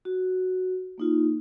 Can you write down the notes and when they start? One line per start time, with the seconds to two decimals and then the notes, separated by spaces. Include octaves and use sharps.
0.05 F#4
0.98 A#3 D#4 F4